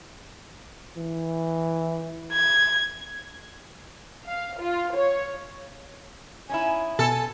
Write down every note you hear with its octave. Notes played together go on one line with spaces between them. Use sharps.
E3
G#6
F5
F4
C#5
C#4 D#4 E4 G#5
B2 A4 G#5